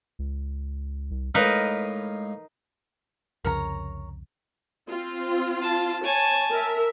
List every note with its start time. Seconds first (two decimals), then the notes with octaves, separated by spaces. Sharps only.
0.19 C#2
1.11 C2
1.35 A2 G#3 D#4 A#4 B4 D#5 F5
3.44 C2 F2 C#3 A#4 C#5 A#5
4.88 C4 F4
5.61 A5
6.04 C#5 G#5 A5
6.51 A#4 E5